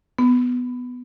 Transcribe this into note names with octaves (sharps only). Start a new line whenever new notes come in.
B3